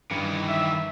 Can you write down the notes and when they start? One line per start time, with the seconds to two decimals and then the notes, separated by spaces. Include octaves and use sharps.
0.11 G2 D#3 E3 C#7
0.47 E5